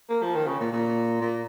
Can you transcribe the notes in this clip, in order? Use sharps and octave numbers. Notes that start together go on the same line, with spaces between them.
A#3
F3
D#3
C#3
A#2
A#2
A#2